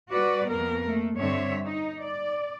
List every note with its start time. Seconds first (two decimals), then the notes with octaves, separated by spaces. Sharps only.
0.11 G3 F#4 B4 D5
0.48 F2 A#3 B3 A#4
0.87 A3 A#3
1.17 G2 D3 C4 C#5 E5
1.66 D#4
2.02 D5